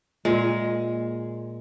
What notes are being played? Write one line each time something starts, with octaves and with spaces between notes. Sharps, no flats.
A#2 G#3